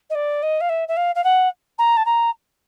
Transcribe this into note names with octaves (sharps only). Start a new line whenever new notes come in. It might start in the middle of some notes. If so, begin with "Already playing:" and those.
D#5
D5
D#5
F5
E5
E5
F5
F5
F#5
A#5
A5
A#5